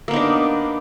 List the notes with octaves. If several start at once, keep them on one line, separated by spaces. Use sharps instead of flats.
A#3 B3 D4 D#4